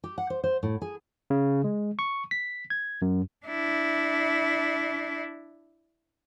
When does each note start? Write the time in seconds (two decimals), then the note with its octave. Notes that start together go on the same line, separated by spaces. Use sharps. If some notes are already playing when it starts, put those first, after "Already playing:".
0.04 G4
0.18 F#5
0.30 C5
0.44 C5
0.63 A2
0.82 G#4
1.30 C#3
1.64 G#3
1.99 C#6
2.31 B6
2.70 G#6
3.02 F#2
3.46 D4 E4